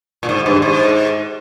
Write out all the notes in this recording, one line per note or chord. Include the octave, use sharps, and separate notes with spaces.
A#2
G#2
G2
G#2